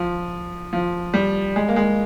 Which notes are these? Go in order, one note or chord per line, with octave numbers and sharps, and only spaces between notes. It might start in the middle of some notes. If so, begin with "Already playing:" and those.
Already playing: F3
F3
G3
G#3
A#3
G#3